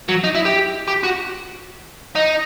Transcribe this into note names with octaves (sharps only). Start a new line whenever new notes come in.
F#3
D#4
E4
G4
G4
F#4
D#4